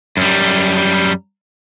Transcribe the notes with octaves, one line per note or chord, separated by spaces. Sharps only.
F#2 G3